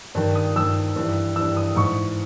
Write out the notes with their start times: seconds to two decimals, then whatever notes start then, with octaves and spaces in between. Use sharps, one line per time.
0.15 G2 D#3
0.35 D#6
0.56 G2 D#3 E6
0.96 G2 E3
1.36 G2 E3 E6
1.57 D#6
1.76 G#2 E3 C#6